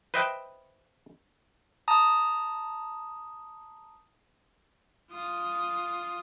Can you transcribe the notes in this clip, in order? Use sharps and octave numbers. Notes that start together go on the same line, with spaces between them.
B4 C5 D#5 E5 G5
A5 A#5 D#6
F4 D#6